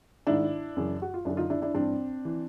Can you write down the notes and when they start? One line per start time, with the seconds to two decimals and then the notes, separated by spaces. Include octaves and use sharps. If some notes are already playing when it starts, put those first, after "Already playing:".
0.27 G#2 D#3 D4 E4
0.77 F#2 C#3 E3
1.02 F#4
1.14 F4
1.25 F#2 D4 E4
1.29 D3
1.37 D#4 F4
1.50 D4 E4
1.62 D4 E4
1.74 G2 E3 C4 D4
2.25 E3